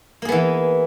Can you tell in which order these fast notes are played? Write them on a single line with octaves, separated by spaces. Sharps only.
A#3 G#4 B3 E3